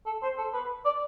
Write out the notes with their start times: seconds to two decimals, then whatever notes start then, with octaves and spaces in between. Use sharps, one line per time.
0.06 A4
0.22 C5
0.38 A4
0.54 B4
0.85 D5